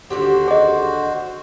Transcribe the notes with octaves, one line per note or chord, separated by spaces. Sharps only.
D#2 D3 F#4 G4 C5
G#4 D#5